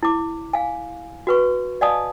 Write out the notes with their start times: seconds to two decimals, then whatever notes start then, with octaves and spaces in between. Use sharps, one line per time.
0.03 E4 D6
0.53 F5 G#5
1.27 F#4 B4 C#6
1.81 D5 D#5 F5 G#5 A5 D#6